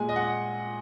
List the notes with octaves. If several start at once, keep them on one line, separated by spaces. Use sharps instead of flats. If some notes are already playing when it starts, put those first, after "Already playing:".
Already playing: A#2 G#3 G#5
D#5
F#5